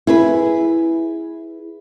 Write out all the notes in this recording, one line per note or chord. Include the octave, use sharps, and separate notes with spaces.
E4 G#4 B4